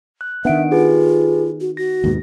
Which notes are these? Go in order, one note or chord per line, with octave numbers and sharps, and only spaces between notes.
F#6
D#3 B3 D4 E5 F#5 D7
F4 G4 G#4 B4
F#4
F#4 A#6
D#2 G#2 B2